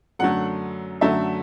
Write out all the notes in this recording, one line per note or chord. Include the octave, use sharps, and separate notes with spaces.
F#2 D3 F#3 A3 F#5
F#2 D3 F#3 A3 E5